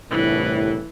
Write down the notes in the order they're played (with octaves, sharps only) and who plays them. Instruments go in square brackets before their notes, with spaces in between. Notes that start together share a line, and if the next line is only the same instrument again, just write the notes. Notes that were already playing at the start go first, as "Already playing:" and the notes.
[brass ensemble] G1 C2 A2 [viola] E3